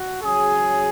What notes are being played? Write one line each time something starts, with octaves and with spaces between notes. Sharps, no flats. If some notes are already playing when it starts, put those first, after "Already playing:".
Already playing: F#4
C#3 F#3 G#4